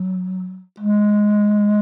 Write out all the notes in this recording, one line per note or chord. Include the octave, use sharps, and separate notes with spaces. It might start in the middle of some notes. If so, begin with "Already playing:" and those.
Already playing: F#3
G#3